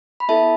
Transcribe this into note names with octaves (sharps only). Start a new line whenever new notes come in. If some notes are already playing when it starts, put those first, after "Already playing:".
B5
B3 E4 A4 E5 A5